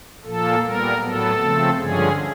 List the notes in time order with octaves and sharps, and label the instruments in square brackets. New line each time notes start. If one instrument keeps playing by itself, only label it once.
[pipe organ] A#2 F3 A#3 A4
A#2 G3 B3 A#4
A2 F#3 B3 A4
C#3 F3 A3 C4
G2 D3 F3 G#3 C#4 G#4